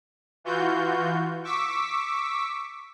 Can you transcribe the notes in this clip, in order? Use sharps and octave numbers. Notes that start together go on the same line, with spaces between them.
E3 F4 F#4 G6
C#6 D6 E6 B6